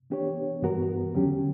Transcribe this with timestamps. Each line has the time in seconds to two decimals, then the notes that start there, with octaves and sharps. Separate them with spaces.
0.10 E3 B3 D4 G4 C#5
0.62 G2 E3 B3 F#4 A#4
1.14 E2 D3 F#3 C#4 G4